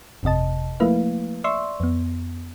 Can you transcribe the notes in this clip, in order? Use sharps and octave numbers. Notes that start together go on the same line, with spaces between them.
G1 F2 C3 D#5 A5
F3 A3 A#3 E4 B4 F5
D5 E5 C6 C#6 E6
F2 B3